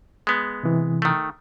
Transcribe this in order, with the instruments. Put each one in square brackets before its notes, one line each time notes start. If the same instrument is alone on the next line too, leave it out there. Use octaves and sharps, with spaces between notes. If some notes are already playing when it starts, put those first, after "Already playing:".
[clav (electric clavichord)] G#3 B3
[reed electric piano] C3 E3
[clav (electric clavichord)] D#3 A3